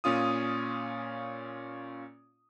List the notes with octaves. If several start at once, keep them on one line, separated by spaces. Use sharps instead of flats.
A#2 C#4 F4 D#6